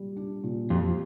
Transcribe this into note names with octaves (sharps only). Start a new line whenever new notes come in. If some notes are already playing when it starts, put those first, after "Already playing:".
Already playing: A#2 G3 G4
D4
A#2
F2 G4